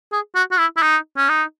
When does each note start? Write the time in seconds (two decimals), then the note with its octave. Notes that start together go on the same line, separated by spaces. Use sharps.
0.13 G#4
0.36 F#4
0.51 F#4
0.59 E4
0.77 E4
0.82 D#4
1.17 C#4
1.29 D#4